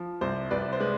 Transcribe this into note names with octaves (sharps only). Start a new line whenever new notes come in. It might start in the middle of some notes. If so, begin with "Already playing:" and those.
Already playing: F3
C2 C5
C2 B4 D5
C5
G#3 B4